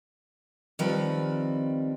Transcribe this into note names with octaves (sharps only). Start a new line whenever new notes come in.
D#3 F3 G3 C4 B4